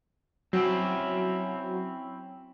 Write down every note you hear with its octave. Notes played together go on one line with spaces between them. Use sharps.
F#3 C4 C#4 E4